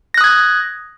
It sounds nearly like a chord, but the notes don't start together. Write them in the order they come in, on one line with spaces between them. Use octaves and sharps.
A#6 F#6 D#6 G#6